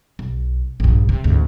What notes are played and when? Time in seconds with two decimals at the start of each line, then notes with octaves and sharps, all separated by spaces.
0.19 B1
0.80 A#1 G2
1.09 C3
1.24 G#1 D2